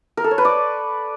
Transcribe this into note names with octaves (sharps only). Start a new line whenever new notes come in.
A#4
A4
C#5
B4
D5